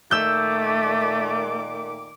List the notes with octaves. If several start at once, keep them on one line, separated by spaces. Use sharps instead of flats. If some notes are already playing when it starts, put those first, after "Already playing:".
A#2 D#3 A3 D6 E6 G6